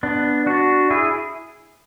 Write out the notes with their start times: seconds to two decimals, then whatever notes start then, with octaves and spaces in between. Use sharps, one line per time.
0.03 B3 D4
0.46 D4 F#4
0.90 E4 G#4